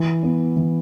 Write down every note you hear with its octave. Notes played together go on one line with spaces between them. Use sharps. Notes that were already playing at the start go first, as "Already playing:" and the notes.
Already playing: E3
B3
E3